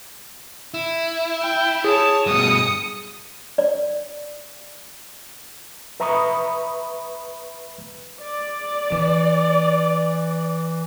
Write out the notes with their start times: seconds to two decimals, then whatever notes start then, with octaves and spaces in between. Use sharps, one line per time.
0.74 E4
1.42 G5
1.84 G#4 C#5 A5
2.26 G2 B2 D#6 C#7
3.58 D5
6.00 B4 E5 A#5 B5 C#6 D#6
8.22 D5
8.92 E3